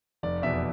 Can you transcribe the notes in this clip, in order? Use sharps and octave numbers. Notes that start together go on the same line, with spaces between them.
F1 D5
E2 B2 E5